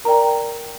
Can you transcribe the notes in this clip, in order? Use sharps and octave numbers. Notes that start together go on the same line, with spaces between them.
A#4 D5 G5 A#5